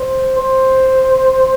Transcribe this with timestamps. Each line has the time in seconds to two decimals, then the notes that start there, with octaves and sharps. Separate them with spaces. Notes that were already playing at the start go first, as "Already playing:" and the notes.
Already playing: C5
0.38 C5